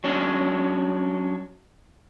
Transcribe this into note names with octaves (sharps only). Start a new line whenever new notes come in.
F#3 C#4 D4